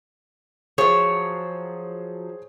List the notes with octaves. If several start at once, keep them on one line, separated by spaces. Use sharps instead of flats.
F3 F#3 G#4 C5 C#5